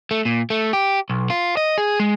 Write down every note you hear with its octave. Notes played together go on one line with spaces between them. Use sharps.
A3
A#2
A3
G4
B1
F4
D#5
G#4
G#3